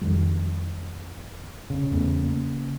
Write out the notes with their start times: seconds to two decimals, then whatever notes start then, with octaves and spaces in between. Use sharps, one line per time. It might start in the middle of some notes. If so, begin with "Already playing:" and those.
0.01 F2 D#3 G3
1.70 C#3
1.91 E2 A3 B3
2.19 A#3